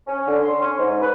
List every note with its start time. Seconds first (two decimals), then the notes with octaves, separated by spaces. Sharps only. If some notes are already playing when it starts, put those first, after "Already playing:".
0.07 C#4
0.27 D3
0.42 C6
0.60 C#4
0.79 G#2
1.01 B4